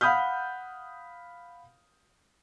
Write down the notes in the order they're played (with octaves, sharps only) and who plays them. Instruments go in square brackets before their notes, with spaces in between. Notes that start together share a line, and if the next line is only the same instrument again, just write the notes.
[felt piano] F5 F#5 B5 D#6 F6 G6